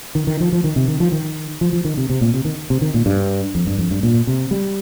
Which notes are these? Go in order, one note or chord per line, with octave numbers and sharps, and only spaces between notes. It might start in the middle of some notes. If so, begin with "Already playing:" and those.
D#3
D#3
F3
F3
D#3
C3
D#3
F3
D#3
F3
F3
D#3
C3
C3
A#2
C3
D#3
C3
D#3
A#2
G2
F2
G2
F2
G2
A#2
C3
G3